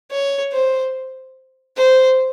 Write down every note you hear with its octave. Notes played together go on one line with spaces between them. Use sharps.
C#5
C5
C5